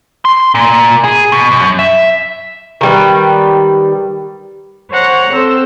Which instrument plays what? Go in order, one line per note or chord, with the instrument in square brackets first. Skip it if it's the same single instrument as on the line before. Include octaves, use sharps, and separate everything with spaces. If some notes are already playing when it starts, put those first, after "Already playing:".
[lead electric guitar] C6
A#2
G#4
B2
F#2
E5
[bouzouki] D#3 G3 B4
[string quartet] C5 C#5 F#5 A#5
C4 A4 C5 E6